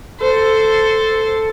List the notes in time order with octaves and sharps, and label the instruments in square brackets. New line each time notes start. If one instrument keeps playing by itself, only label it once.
[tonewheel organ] A4 [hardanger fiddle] C5